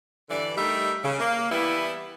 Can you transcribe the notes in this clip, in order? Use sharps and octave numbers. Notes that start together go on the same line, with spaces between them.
G2 D3 E3 D5
G3 A3 D#4 A#4 E5
C#3
A#3
E3 G3 B3 E4